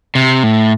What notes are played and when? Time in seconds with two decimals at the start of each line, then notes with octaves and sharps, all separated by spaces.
0.15 C3
0.43 A2